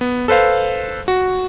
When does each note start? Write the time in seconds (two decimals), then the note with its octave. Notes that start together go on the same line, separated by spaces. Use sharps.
0.01 B3
0.28 A4 B4 C5 F5
1.08 F#4